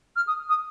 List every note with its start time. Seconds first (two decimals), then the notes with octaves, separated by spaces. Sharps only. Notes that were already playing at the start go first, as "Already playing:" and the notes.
0.16 F6
0.27 D#6
0.49 D#6